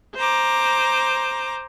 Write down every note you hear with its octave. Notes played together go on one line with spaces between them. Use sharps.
C5 A#5 D6